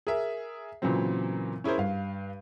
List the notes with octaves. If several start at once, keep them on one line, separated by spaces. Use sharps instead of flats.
G#4 A#4 E5
A#2 C#3 E3 F#3 C4
C#4 E4 G#4 A#4 C5
G2 F5